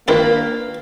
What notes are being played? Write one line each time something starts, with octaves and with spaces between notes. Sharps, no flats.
D#3 A#3 D4 E4 F4 A#4 B4